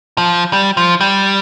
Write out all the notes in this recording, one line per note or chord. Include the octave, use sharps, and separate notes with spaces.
F3
G3
F3
G3